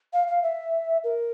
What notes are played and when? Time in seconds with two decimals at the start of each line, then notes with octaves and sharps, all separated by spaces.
0.13 F5
0.28 F5
0.43 E5
1.04 A#4